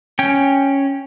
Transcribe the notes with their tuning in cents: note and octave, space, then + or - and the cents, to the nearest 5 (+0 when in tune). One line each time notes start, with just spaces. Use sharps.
C#4 +0 G5 +10